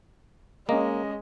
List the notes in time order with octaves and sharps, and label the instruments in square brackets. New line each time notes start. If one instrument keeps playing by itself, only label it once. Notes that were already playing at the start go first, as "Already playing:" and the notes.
[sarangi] G#3 [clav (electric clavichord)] A#3 [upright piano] C#4 D#5